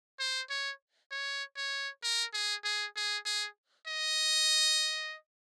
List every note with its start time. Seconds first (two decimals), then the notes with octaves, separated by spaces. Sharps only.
0.20 C5
0.50 C#5
1.11 C#5
1.57 C#5
2.03 A#4
2.33 G#4
2.64 G#4
2.96 G#4
3.26 G#4
3.88 D#5